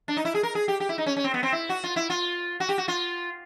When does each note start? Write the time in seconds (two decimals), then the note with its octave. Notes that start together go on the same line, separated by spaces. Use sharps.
0.08 D4
0.17 D#4
0.25 E4
0.35 G#4
0.43 A#4
0.55 G#4
0.68 G4
0.80 G4
0.89 E4
0.98 D#4
1.06 C#4
1.16 C#4
1.24 C4
1.34 B3
1.43 C4
1.52 E4
1.69 F#4
1.84 F4
1.96 E4
2.10 F4
2.60 F#4
2.69 G4
2.78 F#4
2.88 F4